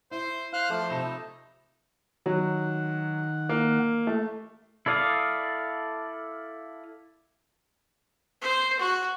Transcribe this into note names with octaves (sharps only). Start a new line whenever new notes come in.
E4 C5
C5 F5 F6 F#6
F3 A3 A5 D6
C3 D#4 B5 E7
D#3 F#3 F#5
A#3
A3
E4 A4 D5 F5 D#6
C5
F#4